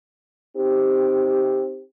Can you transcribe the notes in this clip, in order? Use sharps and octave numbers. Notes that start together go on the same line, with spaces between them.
C4 D#4 G4